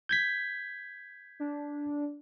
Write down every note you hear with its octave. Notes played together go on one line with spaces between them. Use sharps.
G6 G#6 B6
D4